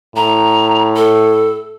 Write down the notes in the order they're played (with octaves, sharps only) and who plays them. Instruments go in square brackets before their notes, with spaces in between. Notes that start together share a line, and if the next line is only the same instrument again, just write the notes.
[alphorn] A2 [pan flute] A#5
[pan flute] A4